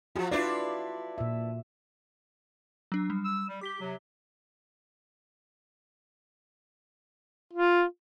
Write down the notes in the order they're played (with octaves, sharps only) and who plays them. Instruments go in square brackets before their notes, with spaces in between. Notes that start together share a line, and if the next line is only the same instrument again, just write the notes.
[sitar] F3 G3 [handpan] F4 F#4
[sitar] D4 E4 B4 [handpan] F4 D5
[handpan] A#2 E5
[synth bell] F#3 D4
G3
[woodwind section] E6
G3
[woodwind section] G4 [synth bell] D6 B6 G7
[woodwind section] C3 F#3
[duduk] F4